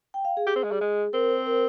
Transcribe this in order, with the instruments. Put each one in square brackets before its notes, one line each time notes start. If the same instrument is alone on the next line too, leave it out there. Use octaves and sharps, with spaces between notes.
[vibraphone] G5
F5
G#4
[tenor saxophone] G4
C4
G#3
G3
G#3
[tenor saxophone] C4 [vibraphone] A#4
[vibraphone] C5
A#4